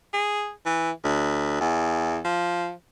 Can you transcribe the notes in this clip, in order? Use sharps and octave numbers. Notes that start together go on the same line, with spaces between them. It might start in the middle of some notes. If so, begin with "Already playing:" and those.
G#4
E3
D2
E2
F3